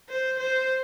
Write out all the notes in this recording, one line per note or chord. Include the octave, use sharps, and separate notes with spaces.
C5
C5